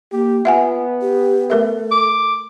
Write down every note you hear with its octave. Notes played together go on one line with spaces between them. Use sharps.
A#3 G4
B3 F4 E5 F#5 G#5
G4
A3 A4 A#4 E5
D6